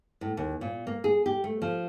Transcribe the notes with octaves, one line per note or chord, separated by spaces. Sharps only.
A2
D#2
A#2
A#3
G#4
G4
A3
F3